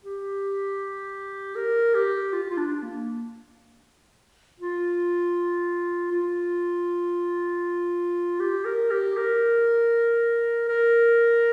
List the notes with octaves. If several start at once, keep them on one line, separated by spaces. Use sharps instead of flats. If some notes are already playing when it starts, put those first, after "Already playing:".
G4
A#4
G4
F4
F4
D4
A#3
F4
F4
G4
A#4
G4
A#4
A#4